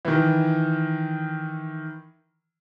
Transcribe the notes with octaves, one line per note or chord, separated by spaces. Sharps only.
D#3 E3